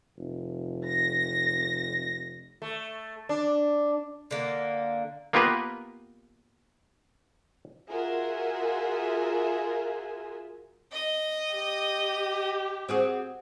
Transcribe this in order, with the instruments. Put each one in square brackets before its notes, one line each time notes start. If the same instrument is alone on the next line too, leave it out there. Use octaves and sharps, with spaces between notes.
[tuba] F1
[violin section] A#6
[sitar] A3
D4
[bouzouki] D3 A#3
[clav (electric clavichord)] A#3 B3 F4 G4 A#4 B4
[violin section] F4 F#4 G#4 A#4 E5
[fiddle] D#5
[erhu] G4
[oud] C4 F#4 G#4